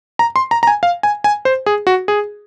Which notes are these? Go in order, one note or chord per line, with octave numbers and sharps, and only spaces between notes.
A#5
C6
A#5
A#5
G#5
F5
G#5
G#5
C5
G#4
F#4
G#4